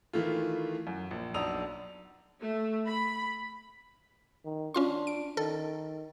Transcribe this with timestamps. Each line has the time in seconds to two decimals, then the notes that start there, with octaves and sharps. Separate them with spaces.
0.13 D#3 E3 A3 F4
0.87 F#2
1.11 A#1
1.34 B1 D4 A#5 D#6 E6 F7
2.40 A3
2.87 B5
4.45 D#3
4.74 C#4 D4 F4 C6
5.07 D7
5.37 D#3 A4